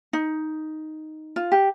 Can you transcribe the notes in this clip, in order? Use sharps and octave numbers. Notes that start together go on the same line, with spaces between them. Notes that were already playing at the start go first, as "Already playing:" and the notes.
D#4
F4
G4